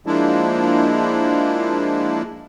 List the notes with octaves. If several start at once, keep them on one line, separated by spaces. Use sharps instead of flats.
F3 G#3 A#3 D4 E4